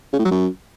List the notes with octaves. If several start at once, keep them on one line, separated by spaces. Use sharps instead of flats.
C#3
A2
F#3
F#2